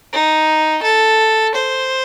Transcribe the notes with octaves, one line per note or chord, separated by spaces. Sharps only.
D#4
A4
C5